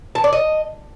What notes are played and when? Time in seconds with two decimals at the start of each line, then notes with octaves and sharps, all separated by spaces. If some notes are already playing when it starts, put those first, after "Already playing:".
0.15 A5
0.24 D5
0.33 D#5